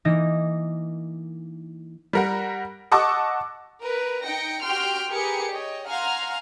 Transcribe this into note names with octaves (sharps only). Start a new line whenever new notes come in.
E3 A#3 D#4 A#6
G3 A#4 F#5
D#5 F#5 A5 C#6 D6 E6
A#4 B4
D#4 G5 A#6 C#7
F#4 G4 G5 C6 F6
G4 G#4 A#4 B4 G#5 C#7
C#5 D#5 G5
F5 F#5 G#5 A#5 C6 F6